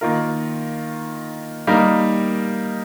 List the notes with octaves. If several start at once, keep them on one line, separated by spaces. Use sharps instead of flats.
D#3 A#3 F4 A#4
G3 A#3 D#4 A#4